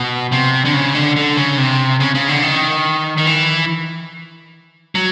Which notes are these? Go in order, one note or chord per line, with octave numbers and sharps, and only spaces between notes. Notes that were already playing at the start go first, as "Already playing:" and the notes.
Already playing: B2
C3
D3
C#3
D3
D3
C#3
C3
C#3
C#3
D3
D#3
D#3
E3
F#3